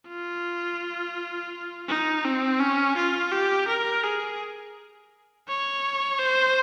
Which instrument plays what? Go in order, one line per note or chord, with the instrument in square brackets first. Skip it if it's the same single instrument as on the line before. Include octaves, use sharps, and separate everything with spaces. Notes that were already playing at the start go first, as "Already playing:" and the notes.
[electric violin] F4
D#4
C4
C#4
F4
G4
A#4
G#4
C#5
C5